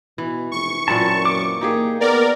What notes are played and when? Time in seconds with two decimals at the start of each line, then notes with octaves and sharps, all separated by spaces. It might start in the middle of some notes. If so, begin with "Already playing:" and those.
0.18 B2 E3
0.51 F1 C#6
0.88 F#2 A#2 E3 C4 A5
1.25 D6
1.61 A#3 D#4 G4 G#4
2.00 B3 A#4 D5